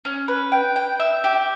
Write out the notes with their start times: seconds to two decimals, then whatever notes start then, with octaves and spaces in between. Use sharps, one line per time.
0.05 C#4
0.28 B4
0.52 G5
0.76 G5
1.00 E5
1.24 G4